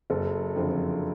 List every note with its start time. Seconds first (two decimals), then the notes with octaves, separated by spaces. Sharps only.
0.10 F#1 A4
0.56 F2 D3 F3